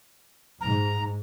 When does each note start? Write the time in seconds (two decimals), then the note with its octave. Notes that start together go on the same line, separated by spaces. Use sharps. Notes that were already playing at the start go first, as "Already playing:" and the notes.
0.61 G#2 A#5